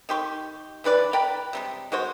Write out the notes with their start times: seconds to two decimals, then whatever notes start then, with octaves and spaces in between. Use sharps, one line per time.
0.09 D#3 G4 C6 C#6
0.84 C#3 E3 B4 D5
1.13 D5 G5 A#5 B5
1.53 C3 G3 G#3
1.92 G#3 F#4 C5 C#5